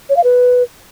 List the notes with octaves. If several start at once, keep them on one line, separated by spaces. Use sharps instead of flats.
C#5
F5
B4